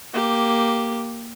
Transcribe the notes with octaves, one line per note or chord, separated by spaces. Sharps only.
A#3 G4